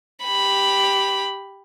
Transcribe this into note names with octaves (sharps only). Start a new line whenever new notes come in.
G4 B5